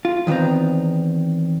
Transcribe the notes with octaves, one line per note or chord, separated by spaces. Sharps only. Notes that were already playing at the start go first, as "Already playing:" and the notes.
F4
E2 D#3 B3 C4 A#5